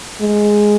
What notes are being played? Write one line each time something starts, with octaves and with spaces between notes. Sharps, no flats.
G#3